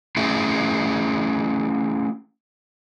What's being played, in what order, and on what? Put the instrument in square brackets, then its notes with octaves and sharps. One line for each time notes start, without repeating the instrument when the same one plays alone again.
[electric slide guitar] A3 C#4 E4 F4 G#4